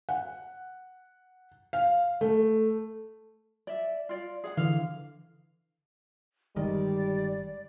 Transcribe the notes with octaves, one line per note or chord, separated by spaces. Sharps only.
F#5
F5
A3
D5 E5
F4 D5
G#4 F5 F#5
D3 E3 F5
G1 D#3 G3 G#3 D5